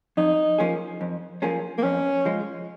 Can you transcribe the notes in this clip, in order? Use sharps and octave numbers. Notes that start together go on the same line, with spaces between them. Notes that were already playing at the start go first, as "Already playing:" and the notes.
F2 D#4
F3 A#3 C#4 G#4
F2
F3 A#3 C#4 G#4
A#3
F2 C#4
F3 G#3